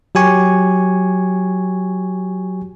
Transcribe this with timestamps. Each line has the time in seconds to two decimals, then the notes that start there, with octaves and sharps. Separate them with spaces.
0.15 F#3 G4 G#5 C#6